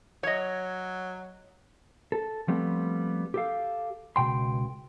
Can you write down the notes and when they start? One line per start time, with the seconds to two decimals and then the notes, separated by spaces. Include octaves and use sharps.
0.23 F#3 C#5 D#5
2.12 A4
2.48 F3 G3 A3 B3 C4
3.34 G4 A4 F5
4.16 C#2 G#2 B2 G5 C6